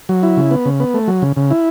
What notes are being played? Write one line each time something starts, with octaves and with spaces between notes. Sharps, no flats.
F#3
E4
C#3
B3
C#3
B3
A3
F#3
C#3
C#3
E4